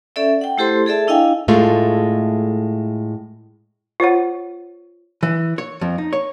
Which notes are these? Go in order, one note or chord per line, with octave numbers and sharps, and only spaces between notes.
C#4 A4 D5 E5
F#5 G5
A3 E4 G4 A4 C5 C6
G#4 A4 D5 E5 A5
D4 E4 D#5 F5 G5 G#5
A2 G#3 A3 F4
F4 C5 C#5 F#5
E3
C#5
F2
D#4
C#5